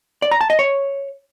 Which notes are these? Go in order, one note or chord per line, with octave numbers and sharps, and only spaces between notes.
D5
A#5
A5
D#5
C#5